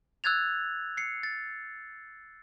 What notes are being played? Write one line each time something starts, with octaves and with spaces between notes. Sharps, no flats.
E6 F#6 G#6 A6 F7
C7 C#7
A6